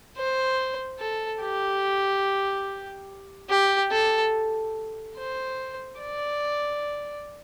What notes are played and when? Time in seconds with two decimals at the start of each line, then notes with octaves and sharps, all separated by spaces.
0.17 C5
0.99 A4
1.41 G4
3.50 G4
3.91 A4
5.17 C5
5.99 D5